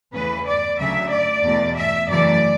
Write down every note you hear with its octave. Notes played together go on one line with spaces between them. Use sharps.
E2 C#3 E3 A3 B4
D5
D2 C#3 F#3 A3 E5
D5
E2 B2 A3
E5
F#2 C#3 E3 A3 D5